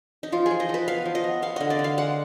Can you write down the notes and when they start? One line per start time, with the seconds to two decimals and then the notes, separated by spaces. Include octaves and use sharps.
0.23 D#4
0.32 F3 F4
0.46 G#4
0.51 F3
0.60 D#5
0.69 F3 B4
0.88 B3 F5
1.05 F3
1.15 D#5
1.24 B3
1.42 B3 F5
1.56 D3 D#5
1.70 D5
1.79 D3
1.84 F5
1.98 G#3 F#5